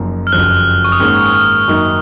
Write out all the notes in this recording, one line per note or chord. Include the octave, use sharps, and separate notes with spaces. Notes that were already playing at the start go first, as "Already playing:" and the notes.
Already playing: F#1 F#2 F3 A#3 D#4
F6
F#1 F2 F3 F#6
C#6
D#6
G#2 D#3 A#3 C#4 G#4 F6
F6
F#2 D#3 A#3 D#4